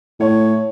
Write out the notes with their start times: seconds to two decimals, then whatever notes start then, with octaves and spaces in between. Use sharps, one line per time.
0.20 A2 C#5